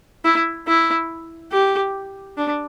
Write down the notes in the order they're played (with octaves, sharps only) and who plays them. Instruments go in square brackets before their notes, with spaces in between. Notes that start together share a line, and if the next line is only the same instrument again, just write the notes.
[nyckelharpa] E4
E4
G4
D4